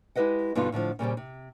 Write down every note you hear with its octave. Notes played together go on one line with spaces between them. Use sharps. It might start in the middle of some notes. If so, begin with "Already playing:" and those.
G#3 E4 G4 B4 D#5 F#5
G2 B2 D3 B3 D#4 F4
A2 D3 E3 F3
A#2 C#3 G3 C4
C3